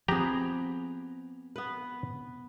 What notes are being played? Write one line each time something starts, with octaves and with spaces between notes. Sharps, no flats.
F3 B3 C4 G4 G#4 A#5
B3 B4